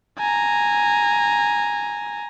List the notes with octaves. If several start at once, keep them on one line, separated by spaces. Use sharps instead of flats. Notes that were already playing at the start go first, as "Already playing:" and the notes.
G#5 A#5